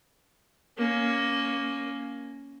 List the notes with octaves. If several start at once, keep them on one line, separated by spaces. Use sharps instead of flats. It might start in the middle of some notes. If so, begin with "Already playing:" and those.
A#3 C#4